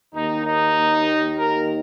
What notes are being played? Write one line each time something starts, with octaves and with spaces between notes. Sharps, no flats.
D#2 D#3 D#4
D#4
A#4